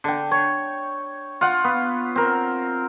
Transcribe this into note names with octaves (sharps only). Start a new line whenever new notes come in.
D3 G5
C#5
F4 F#5
B3
C4 A#4